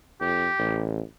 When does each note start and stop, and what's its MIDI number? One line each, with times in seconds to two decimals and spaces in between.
0.21 0.48 41
0.21 0.84 67
0.59 1.00 33